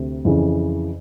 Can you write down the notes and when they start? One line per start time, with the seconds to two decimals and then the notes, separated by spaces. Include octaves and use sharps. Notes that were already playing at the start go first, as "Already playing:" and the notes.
Already playing: D2 C3
0.25 F2 C#3 E3